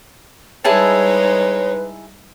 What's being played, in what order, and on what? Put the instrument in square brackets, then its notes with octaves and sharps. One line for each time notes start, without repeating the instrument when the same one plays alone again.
[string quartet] G3 G#3 D#4 [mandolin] E4 G#4 A5 [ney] B4 [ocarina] C#5